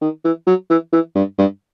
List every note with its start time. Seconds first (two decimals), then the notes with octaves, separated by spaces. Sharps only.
0.01 D#3
0.24 E3
0.47 F#3
0.70 E3
0.93 E3
1.15 G2
1.38 G2